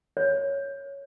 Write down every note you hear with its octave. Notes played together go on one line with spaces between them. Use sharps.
C#5